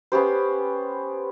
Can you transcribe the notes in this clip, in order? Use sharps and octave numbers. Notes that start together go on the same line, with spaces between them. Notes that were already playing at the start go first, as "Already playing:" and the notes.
B3 C#4 G4 C5